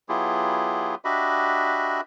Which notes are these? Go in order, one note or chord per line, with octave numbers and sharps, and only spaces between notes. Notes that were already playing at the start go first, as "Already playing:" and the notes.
F#3 B3 E4 F4 G4 G#4
D4 F#4 G4 D#5 E5 B5